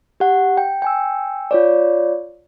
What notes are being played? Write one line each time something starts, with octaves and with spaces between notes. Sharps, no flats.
G4 F#5
G5
G5 G#5 E6
F4 C#5 D5